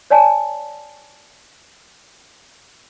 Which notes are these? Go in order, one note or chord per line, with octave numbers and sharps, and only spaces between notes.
C#5 D5 G#5 A5